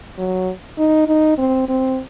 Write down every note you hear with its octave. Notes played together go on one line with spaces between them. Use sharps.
F#3
D#4
D#4
C4
C4